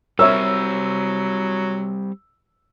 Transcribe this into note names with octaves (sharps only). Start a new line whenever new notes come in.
F#3 G3 C4 A#4 C#5 E5 E6